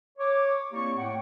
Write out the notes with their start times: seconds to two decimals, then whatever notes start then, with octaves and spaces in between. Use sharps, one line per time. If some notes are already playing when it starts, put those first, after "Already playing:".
0.18 C#5 D6
0.72 A#3 C4 E4 G4 D5 C#6
0.96 A2 A3 F#5 G5